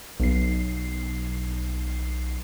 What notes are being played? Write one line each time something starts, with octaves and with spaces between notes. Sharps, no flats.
B1 C7